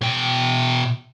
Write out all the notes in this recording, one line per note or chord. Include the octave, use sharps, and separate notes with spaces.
B2 G5